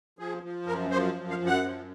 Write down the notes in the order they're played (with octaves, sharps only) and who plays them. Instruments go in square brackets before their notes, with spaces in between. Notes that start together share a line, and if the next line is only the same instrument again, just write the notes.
[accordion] F3 G#4
F3
F#2 A#4
F3 C5
F#2
F5
F#2
F#5
F3